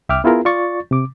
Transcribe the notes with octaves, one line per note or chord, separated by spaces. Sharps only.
C2 E5 G5 D6 F6
B3 E4 F4 G#4 A#4
F4 D5 C#6 A6
C3 D6